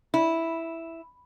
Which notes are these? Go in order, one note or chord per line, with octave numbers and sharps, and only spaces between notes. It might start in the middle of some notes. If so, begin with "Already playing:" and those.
E4